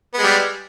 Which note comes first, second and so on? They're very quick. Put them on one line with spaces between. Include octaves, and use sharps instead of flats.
B3 G#3 G3